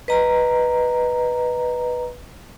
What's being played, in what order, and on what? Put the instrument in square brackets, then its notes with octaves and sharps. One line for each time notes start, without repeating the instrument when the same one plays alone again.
[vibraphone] B4 D#5 A#5